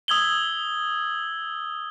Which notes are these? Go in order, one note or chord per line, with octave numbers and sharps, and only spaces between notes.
D#6 E6 G#6 F#7 G7